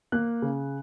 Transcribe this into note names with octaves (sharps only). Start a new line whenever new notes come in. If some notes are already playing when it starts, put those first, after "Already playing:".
A#3 F#6
C#3